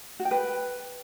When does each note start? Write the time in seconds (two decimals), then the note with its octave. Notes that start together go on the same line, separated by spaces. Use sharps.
0.20 F#4
0.25 G5
0.31 B4